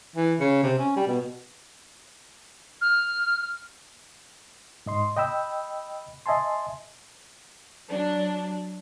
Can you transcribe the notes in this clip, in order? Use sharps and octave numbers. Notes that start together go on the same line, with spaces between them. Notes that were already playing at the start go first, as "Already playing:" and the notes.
E3
C#3
C3
C#4
G3
B2
F6
G#2 D#5 C6
D#5 G5 B5 E6
D#5 E5 G#5 A5 C6
F#3 D4